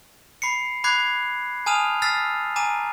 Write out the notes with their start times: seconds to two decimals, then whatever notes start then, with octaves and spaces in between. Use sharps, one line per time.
0.42 B5 C7 C#7
0.84 B5 D6 F#6 G#6 C7
1.66 G#5 A5 D#6 F6 D#7 F7
2.02 E6 F6 A6 B6 C7
2.56 G#5 A#5 D6 D#7